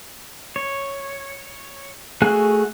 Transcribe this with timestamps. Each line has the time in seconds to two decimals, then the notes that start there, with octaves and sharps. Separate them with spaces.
0.56 C#5
2.22 A3 F#4 G#4 G#5 F#6